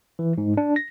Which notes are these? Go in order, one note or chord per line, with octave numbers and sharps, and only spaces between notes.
E3
G#2
D4
A#6